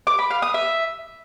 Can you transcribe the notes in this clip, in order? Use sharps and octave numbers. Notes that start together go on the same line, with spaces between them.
D6
B5
F5
D#6
E5